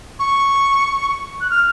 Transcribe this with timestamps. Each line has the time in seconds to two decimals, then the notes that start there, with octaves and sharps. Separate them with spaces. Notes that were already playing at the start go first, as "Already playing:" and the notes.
0.19 C#6
1.41 F#6
1.50 F6